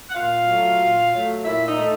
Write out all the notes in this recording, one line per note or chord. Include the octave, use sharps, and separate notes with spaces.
F#5
A#2 F4 F5
F#3 A3
A#2
F#3 A3
A#2 E4 E5
D#4 D#5
A3